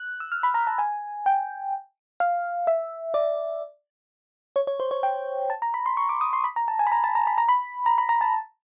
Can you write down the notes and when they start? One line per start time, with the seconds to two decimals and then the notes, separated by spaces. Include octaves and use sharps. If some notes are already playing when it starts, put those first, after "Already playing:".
Already playing: F#6
0.20 E6
0.32 F6
0.43 B5
0.54 A#5
0.67 A5
0.78 G#5
1.26 G5
2.20 F5
2.67 E5
3.14 D5
4.56 C#5
4.67 C#5
4.80 C5
4.91 C#5
5.03 G5
5.50 A5
5.62 A#5
5.74 B5
5.86 C6
5.97 C#6
6.09 D6
6.21 D#6
6.33 C6
6.44 B5
6.56 A#5
6.68 A5
6.79 G#5
6.87 B5
6.92 A#5
7.04 A5
7.15 A#5
7.27 B5
7.38 A#5
7.49 B5
7.86 A#5
7.98 B5
8.09 A#5
8.21 A5